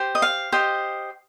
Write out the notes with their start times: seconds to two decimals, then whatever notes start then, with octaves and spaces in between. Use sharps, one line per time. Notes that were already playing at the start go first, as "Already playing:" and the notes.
Already playing: G4 C5
0.15 D#5
0.22 F5
0.52 G4 C5 D#5